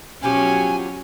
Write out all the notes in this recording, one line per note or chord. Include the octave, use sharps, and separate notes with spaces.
B2 F3 F#3 C#4 G4 G#5